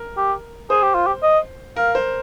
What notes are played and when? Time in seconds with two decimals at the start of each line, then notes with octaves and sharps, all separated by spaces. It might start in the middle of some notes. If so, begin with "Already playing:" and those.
Already playing: A#4
0.17 G4
0.70 G#4 C5
0.83 G4
0.95 F4
1.07 G4
1.23 D#5
1.76 A#4 F5
1.95 C5